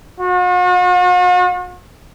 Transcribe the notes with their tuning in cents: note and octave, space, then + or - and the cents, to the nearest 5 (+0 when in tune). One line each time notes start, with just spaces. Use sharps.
F#4 -45